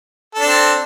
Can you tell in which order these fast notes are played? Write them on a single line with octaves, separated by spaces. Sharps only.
A4 D4 C4